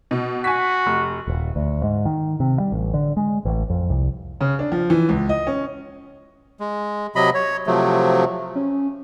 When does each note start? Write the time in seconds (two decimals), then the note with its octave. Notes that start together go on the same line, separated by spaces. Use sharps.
0.11 B2
0.44 F#4 G#5 B6
0.86 F1
1.28 D#1
1.56 D2
1.83 G#2
2.06 D#3
2.40 C3
2.60 G3
2.72 A1
2.94 D3
3.17 G#3
3.45 A1
3.70 F2
3.90 C2
4.41 C#3
4.59 D4
4.72 F3
4.90 E3
5.09 C#2
5.29 D#5
5.47 C#4
6.60 G#3
7.16 C3 F#3 D#5 B5
7.35 C#5
7.67 C3 F3 F#3 A3
8.56 C#4